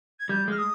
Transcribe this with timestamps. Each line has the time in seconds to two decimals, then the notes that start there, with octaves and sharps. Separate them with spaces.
0.19 G#6
0.29 G3 G6
0.48 G#3 F6
0.58 D#6